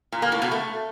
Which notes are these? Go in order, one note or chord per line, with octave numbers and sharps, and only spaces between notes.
A#2
A#3
A2
B2
A3